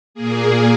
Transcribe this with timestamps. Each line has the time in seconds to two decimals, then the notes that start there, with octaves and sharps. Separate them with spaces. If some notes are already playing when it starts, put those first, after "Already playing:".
0.14 A#2 A#3 G#4